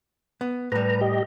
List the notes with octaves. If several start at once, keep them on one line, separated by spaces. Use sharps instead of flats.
B3
A2 G3 B4 A#5
G4 D#5